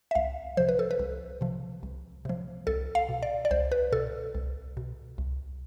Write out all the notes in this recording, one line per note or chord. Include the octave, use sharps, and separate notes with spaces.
E5
C2 F5
C3 F3 C5
B4
A4
B4
C2
C3 F3
C2
C3 F3
C2 A4
F5
B2
D5
D5
C2 C5
B4
B2 A4
C2
B2
C2